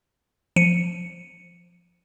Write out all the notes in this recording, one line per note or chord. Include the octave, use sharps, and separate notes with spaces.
F3 C#7 D#7